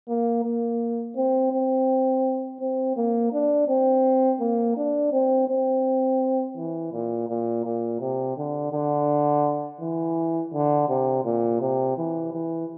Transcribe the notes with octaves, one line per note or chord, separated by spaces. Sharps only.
A#3
A#3
C4
C4
C4
A#3
D4
C4
A#3
D4
C4
C4
E3
A#2
A#2
A#2
C3
D3
D3
E3
D3
C3
A#2
C3
E3
E3